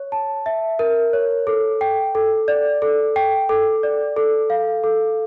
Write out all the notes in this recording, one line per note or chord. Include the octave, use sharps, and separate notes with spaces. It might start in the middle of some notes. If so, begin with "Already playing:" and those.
Already playing: C#5
A5
E5
A#4
C#5
A4
G5
A4
D5
A4
G5
A4
D5
A4
F5
A4